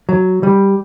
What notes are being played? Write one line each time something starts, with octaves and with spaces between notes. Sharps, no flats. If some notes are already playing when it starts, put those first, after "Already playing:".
F#3
G3